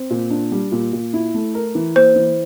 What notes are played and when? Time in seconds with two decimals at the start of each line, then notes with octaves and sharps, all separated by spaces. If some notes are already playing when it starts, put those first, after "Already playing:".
Already playing: C4
0.10 A#2
0.30 D4
0.52 G3
0.72 A#2
0.93 A#2
1.13 E4
1.34 A3
1.55 A#4
1.75 E3
1.96 A#3 C5
2.16 E3